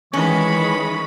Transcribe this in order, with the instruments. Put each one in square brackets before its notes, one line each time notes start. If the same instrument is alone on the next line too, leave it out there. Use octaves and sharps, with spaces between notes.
[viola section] D#3 G#3 B5 [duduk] E3 [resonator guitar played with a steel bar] C#4 [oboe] C#6